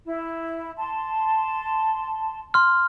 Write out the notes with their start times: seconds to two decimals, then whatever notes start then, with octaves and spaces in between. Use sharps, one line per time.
0.06 E4
0.77 A5 C6
2.54 C6 F6